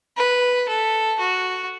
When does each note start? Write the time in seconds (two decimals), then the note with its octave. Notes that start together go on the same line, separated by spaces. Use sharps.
0.17 B4
0.69 A4
1.19 F#4